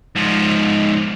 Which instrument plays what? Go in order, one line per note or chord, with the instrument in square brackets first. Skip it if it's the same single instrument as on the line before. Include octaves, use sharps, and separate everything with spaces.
[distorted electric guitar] G#2 F3